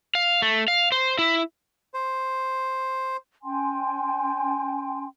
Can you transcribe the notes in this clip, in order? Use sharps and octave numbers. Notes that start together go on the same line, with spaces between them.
F5
A3
F5
C5
E4
C5
C#4 G5 G#5 C6